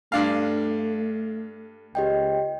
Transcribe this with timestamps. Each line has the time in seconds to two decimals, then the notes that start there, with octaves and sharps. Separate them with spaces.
0.12 G2 A3 D4 F5
1.95 C#2 G4 D#5 G5